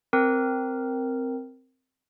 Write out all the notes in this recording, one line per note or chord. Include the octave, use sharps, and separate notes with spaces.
C4 A#4